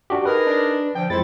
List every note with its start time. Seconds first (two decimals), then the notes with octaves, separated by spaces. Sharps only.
0.10 D4 F#4 G4
0.25 D#4 G#4 A#4 B4
0.47 D4
0.95 D3 F3 G5
1.10 F2 F3 G#3 C4 E4 A4 A6